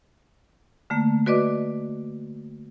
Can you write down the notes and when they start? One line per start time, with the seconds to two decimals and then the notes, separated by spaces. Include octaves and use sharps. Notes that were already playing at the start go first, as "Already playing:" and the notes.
0.90 D3 A3 A#3
1.26 F#4 B4 D5 D#5 D6